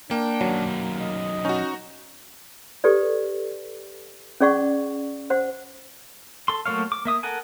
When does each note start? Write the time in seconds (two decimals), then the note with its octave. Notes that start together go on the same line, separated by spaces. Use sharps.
0.11 A#3 D4 G5
0.41 F#2 D#3 F#3
1.02 D#5
1.45 C#4 D#4 F#4
2.84 G4 A4 B4 D5
4.41 C#4 G#4 D5 F#5 C#6
5.30 C5 F#5
6.48 A4 C6
6.66 F#3 A3 A#3 C#5 F5
6.92 D6
7.05 A#3 E5 D#6
7.23 A4 A#4 F#5 G#5